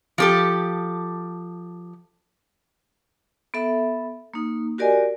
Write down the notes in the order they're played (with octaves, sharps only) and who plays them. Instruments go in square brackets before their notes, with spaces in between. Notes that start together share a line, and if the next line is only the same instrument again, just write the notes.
[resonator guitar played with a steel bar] F3 G4 A4
[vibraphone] B3 A4 E5
A#3 D#4
F#4 G4 A#4 D5 D#5 G#5